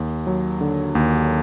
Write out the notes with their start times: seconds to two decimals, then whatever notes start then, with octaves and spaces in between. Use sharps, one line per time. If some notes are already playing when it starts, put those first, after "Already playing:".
Already playing: D#2
0.27 F#3
0.61 D3
0.95 D#2